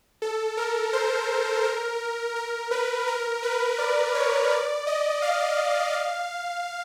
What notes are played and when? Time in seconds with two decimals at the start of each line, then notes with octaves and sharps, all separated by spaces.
0.22 A4
0.57 A#4
0.93 C5
1.64 A#4
2.36 A#4
2.71 B4
3.07 A#4
3.43 B4
3.78 D5
4.15 C#5
4.51 D5
4.87 D#5
5.22 F5
5.93 F5